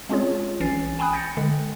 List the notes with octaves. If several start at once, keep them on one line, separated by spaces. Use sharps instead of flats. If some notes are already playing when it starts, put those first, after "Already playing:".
G#3 C4 C#4 F4 G#4 C#5
B1 E3 C#4 G#5 A6 C7
G5 G#5 B5 D#6 F#6
G5 G6 A6 A#6 C#7
D3 G#3